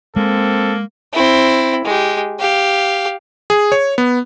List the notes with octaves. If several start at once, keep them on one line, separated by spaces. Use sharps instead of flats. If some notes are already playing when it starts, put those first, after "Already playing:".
G#3 A#3 C4 A4
C4 E4
G#3 G4
G4 F5
G#4
C#5
B3